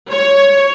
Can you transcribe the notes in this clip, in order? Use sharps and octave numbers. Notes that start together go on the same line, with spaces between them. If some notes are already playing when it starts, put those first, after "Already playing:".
C#5